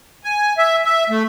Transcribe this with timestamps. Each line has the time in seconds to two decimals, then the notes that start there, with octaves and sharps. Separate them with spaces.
0.24 G#5
0.58 E5
0.85 E5
1.10 A3